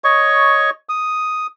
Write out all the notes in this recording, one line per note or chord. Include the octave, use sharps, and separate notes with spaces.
C#5 D#5 C#6
D#6